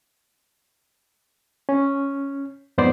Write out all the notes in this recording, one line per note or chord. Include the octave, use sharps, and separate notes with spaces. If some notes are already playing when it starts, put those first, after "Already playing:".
C#4
F2 G#2 B3 C5 D5